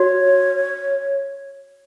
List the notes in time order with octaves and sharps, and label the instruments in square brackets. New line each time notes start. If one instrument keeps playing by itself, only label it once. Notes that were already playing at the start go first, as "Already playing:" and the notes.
Already playing: [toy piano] F#4 [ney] C#5